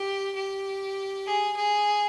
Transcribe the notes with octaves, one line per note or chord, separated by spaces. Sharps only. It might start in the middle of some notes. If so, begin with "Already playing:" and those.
Already playing: G4
G4
G#4
G#4